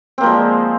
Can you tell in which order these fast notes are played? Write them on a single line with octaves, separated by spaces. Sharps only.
C4 A#3 F3 G#3